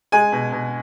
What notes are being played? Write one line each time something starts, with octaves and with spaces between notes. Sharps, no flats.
G#3 G#5
B2
B2